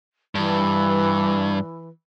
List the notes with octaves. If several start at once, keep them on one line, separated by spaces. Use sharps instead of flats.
G2 E3